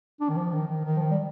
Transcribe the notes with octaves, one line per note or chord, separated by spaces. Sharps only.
D4
D#3
F3
D#3
D#3
D#3
F3
D#3
G3